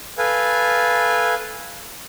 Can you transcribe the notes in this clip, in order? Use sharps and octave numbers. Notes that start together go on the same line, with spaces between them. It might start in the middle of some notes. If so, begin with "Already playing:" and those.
A4 B4 F5 G#5